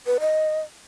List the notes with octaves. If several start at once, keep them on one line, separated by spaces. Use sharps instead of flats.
B4
D#5